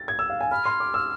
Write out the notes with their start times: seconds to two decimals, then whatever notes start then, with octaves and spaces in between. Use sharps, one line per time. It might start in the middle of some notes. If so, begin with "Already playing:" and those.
Already playing: A6
0.08 G#6
0.19 E6
0.30 F5
0.41 G#5
0.51 B5 F6
0.66 C6
0.80 D6
0.94 E6